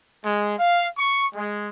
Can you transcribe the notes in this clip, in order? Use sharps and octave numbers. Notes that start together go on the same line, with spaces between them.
G#3
F5
C#6
G#3